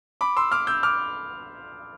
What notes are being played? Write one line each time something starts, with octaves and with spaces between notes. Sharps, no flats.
B5 D6
C6 E6
D6 F6
E6 G6
D6 F6